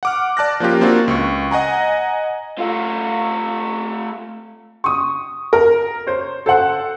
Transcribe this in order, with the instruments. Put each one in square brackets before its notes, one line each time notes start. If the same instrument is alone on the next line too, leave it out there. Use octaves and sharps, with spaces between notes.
[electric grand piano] F#5 D6 F6
D5 A5 F#6 A#6
F3 A#3 C#4 F4 G4
A#3 C4 D4 F4 F#4
C#2 C#6
D#5 F#5 G#5 A#5
[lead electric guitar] A3 F4
[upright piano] C#6 D#6
A#4
C5 C#5
A4 C5 F#5